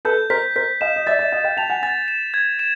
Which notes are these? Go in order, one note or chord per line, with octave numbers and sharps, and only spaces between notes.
A4 B4 G6
A#4 C5 B6
A#4 C5 B6
D#5 F5 E7
D#5
D5 E5 A6
D5 E5
D#5 F5 A6
F5 G5
G5 A5 F7
F#5 G#5
F#5 G#5 A6
E7
G#6
E7